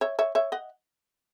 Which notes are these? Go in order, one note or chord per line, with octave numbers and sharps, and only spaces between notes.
C#5 E5
C#5 E5
C#5 E5
D#5 F#5